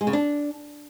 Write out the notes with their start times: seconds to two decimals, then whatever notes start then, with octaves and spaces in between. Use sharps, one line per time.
0.01 G#3
0.07 C#3
0.13 D4